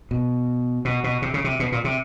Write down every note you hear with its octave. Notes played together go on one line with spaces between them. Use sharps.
B2
B2
B2
C3
C#3
C3
B2
A#2
C3